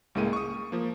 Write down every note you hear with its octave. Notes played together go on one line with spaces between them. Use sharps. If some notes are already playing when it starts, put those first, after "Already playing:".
C#2 A2 G#3 A#3 D#7
C#6 D#6
F3 A#3